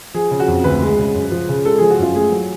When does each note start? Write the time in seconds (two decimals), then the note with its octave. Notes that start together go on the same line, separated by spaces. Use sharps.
0.14 F3 G#4
0.31 C#3
0.40 F#4
0.48 F2
0.64 D2 B4
0.81 G#3
0.99 C#3
1.15 F#2
1.31 F3
1.49 C#3
1.65 G#3 A4
1.78 F3 G#4
1.90 F#4
1.99 F#2 F4
2.15 A3 G#4
2.32 F#3